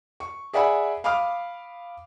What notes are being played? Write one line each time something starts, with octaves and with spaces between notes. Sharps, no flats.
C#6
G#4 D5 E5 F#5 G#5 B5
F5 B5 D6 D#6 F6